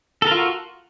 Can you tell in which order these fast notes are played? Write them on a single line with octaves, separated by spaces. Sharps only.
A4 A#4 F4 F#4